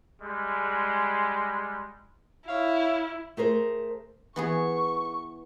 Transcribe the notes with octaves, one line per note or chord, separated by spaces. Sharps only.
G3 G#3
E4 C#5 F5
A3 G#4 A#4 C5
E3 B3 G#4 C#6